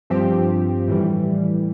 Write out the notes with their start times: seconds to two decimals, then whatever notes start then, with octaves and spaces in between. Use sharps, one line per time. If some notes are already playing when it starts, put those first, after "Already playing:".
0.10 G2 F3 C4 G4
0.88 A2 E3 G3